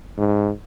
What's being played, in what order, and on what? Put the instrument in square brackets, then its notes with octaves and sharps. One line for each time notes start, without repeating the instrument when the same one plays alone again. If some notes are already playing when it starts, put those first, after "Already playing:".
[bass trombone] G#2